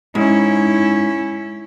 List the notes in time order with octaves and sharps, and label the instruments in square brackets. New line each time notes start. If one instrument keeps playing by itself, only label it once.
[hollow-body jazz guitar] G#2 [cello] C#4 E4